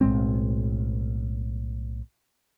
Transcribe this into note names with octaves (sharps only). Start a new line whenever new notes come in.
B1 A2 G#3 C4